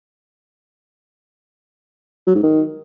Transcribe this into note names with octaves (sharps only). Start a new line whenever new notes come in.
F#3
G#2
D#3